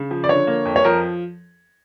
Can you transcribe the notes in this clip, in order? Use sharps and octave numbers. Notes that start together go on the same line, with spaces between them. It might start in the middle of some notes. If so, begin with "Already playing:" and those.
Already playing: C#3
F3
D5
D3 C#5
A#3
F2
C#5
F3 A#4